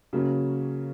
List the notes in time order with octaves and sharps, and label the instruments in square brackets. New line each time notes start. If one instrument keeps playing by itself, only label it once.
[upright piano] C#3 F#3 A#3 C#4